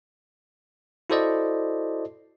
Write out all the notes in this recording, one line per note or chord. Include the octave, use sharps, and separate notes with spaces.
E4 F#4 A4 C5 D5 D#5